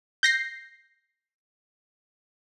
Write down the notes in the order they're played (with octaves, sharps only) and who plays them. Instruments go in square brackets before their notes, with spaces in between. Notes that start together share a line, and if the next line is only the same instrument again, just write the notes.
[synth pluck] G6 A#6 C7